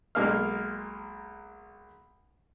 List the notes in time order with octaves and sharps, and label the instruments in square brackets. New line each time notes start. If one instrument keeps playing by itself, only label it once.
[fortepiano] B1 G#3 A#3 F5 F6